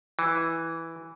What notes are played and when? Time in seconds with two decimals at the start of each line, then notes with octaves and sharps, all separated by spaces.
0.19 E3